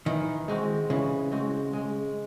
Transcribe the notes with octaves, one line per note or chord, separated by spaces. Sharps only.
D#3 E3
G#3 C4 F#4
C#3 E3
G#3 C4 F#4
G#3